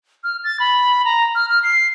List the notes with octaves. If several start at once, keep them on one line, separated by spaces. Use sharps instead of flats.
F6
A6
B5
A#5
F6
F6
C7